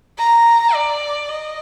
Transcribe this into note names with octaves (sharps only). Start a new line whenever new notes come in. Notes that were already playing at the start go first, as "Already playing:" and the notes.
A#5
D5
D#5